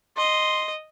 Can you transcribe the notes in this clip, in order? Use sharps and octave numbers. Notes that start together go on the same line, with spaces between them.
D#5 C6